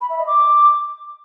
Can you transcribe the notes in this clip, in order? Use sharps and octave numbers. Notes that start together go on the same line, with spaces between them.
B5
E5
D#5
D6